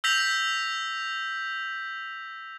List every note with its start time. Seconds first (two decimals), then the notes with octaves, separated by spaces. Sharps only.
0.04 E6 G6 A#6 B6 F7 F#7